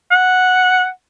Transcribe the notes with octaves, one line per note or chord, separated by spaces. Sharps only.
F#5